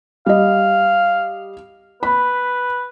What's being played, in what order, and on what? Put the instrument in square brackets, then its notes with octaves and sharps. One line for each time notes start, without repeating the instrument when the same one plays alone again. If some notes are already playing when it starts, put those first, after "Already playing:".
[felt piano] G3 D#5 [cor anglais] F5
[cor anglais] B4 [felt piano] B5